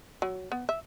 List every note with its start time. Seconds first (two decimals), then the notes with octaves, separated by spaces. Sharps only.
0.22 F#3
0.52 B3
0.69 E5